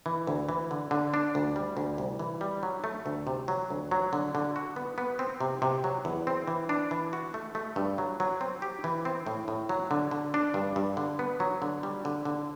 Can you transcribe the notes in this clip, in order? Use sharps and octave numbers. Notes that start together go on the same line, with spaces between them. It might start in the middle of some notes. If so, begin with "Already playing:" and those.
E3
D2
E3
D3
D3
D4
D2
G3
D2
C2
E3
G3
F#3
A3
D2
C3
F#3
D2
F#3
D3
D3
F#4
B3
B3
C4
C3
C3
F#3
E2
C4
E3
D4
E3
F#4
A3
A3
G2
F#3
F#3
C4
G4
E3
C4
A2
A2
F#3
D3
D3
D4
G2
G2
D3
B3
F#3
D3
G3
D3
D3